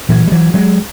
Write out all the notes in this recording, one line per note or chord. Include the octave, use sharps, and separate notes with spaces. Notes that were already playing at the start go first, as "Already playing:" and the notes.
A#2 E3 F#3
G3
E3 F#3
F#3 G#3